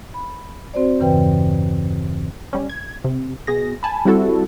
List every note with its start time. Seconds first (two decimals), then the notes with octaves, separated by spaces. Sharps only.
0.14 B5
0.74 C4 F#4 C5 D5
1.00 E2 G2 C#3 E3 B4 G5
2.53 G3 C#4
2.70 G#6
3.04 C3
3.47 B2 G#4 A#6
3.83 G#5 A5 B5
4.05 G3 C4 E4 F#4 A4